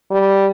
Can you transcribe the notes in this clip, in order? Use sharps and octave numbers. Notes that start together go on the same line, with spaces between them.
G3